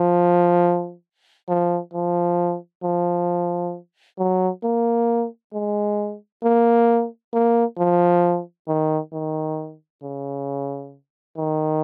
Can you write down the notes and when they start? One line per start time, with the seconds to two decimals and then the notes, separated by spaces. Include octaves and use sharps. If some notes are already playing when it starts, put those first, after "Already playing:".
Already playing: F3
1.48 F3
1.94 F3
2.83 F3
4.18 F#3
4.63 A#3
5.53 G#3
6.43 A#3
7.33 A#3
7.78 F3
8.68 D#3
9.13 D#3
10.02 C#3
11.37 D#3